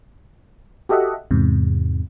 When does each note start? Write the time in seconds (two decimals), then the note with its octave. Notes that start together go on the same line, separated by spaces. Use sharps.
0.89 F#4 G4 A4 D#5 E5 F#5
1.31 E2 G#2 C3